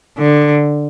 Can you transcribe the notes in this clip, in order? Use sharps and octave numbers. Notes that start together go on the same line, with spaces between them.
D3